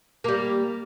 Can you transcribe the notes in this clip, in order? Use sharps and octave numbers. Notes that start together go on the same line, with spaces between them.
G3 A#3